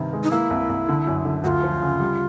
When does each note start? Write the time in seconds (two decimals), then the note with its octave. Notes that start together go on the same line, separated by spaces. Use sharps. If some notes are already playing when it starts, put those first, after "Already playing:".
Already playing: G2 C3 D#3
0.13 G#3
0.24 D#4
0.31 A#3 E4
0.50 C2
0.69 C2
0.89 D3
1.07 F#2
1.25 D3
1.44 D2 F#4
1.48 F4
1.63 F3
1.81 C#3
2.00 G3